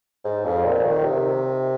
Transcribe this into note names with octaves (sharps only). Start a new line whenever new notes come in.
G#2
F2
A#2
D#3
C3